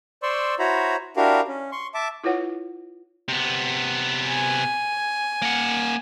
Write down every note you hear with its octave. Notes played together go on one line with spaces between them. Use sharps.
C5 D5 C6 C#6 E6
E4 F#4 C5 C#5 A#5 B5
D4 E4 F#4 G4 A#4 F5
C#4
C6 C#6
E5 A5 D6
E4 F4 B4 C#5 F#5
C3 B3
G#5
A#3 F#5